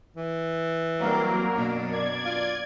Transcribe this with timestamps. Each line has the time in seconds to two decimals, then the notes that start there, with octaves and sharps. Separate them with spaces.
0.17 E3
0.99 F#3 G3 A#3 C4 D4 A#4
1.52 F#2 B2 D4
1.89 D5 G#6
2.25 F4